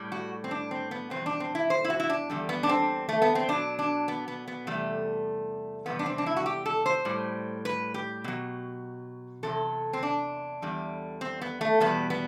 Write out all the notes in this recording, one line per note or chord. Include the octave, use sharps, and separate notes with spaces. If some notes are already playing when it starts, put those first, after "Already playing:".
Already playing: A2 G3
F#4
C4
D4
C4
B3
E2 B2 G3 C4
D4
C4
E4
C5
E4
F#4
E4
D4
E2 D3 G3
B3
D4
C4
A3
B3
C4
B2 F#3 D4
D4
B3
B3
B3
E2 C3 G3 A3
E2 C3 E3 G3 B3
D4
C4
D4
E4
F#4
G4
A4
C5
A2 G3
B4
G4
B2 F#3
E2 C3 F#3 A4
C4
D4
E2 D3 G3
C4
B3
A3
E2 B2 G3 B3
B3